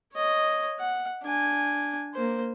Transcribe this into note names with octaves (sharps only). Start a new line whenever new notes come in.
C#5 D#5
F#5
D4 G#5
A#3 C5